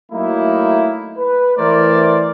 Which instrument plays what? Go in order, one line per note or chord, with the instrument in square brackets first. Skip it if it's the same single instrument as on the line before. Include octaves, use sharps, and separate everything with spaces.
[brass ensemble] F#3 A3 A#3 D#4 E4
B4
E3 A3 A#4 C5 D5